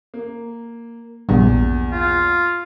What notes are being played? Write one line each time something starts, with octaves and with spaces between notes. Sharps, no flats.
A#3
A#1 E2 G2 A#2
F4